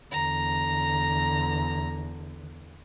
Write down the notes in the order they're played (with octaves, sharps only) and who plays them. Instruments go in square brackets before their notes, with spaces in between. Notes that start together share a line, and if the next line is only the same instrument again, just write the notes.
[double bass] E2 D3 [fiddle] A#5